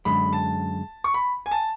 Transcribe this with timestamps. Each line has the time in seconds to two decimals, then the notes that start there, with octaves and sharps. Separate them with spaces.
0.05 F#2 D3 G#3 B5
0.33 A5
1.04 C#6
1.14 B5
1.46 G#5
1.51 A5